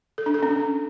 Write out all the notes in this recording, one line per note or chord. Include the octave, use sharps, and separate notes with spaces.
A4
D4
A4
C#4